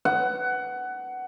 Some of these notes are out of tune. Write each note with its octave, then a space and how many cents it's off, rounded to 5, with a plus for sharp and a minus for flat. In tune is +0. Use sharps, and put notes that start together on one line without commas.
F#5 +15